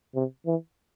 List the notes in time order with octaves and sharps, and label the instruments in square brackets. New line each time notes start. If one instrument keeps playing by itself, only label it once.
[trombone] C3
E3